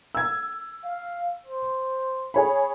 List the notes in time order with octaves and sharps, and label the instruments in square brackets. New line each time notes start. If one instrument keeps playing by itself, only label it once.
[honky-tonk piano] E6 G#6
[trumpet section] F5
C5
[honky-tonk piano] G#4 C#5 B5